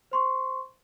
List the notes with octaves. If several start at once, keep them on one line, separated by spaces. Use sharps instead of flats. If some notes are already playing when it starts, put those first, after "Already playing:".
C5 C6 C#6